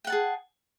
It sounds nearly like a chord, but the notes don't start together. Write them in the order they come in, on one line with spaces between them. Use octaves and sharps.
G5 F#5 A5 G#4